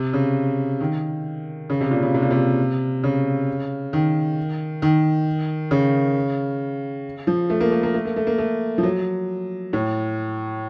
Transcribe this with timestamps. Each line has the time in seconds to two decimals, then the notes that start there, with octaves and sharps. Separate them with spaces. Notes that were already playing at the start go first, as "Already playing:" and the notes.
Already playing: C3
0.13 C#3
0.80 D#3
1.70 C#3
1.81 C3
1.91 A#2
2.03 C#3
2.14 C3
2.22 A#2
2.31 C3
3.04 C#3
3.93 D#3
4.82 D#3
5.71 C#3
7.27 F3
7.50 A3
7.60 A#3
7.71 A3
7.83 A#3
7.94 A3
8.05 A#3
8.16 A3
8.27 A#3
8.38 A3
8.78 F3
8.83 F#3
9.73 A2